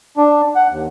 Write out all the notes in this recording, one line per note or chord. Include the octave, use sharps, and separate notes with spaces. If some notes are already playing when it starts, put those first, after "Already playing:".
D4
F#5
D#2